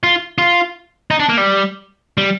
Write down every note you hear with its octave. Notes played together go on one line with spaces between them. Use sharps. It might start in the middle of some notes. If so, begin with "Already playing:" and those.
F4
F4
D#4
D4
A#3
G3
G3